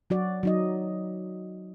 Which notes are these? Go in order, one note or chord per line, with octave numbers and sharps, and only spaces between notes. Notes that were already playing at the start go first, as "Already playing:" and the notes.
F#3 F#4 D5
F#3 D#4 D#5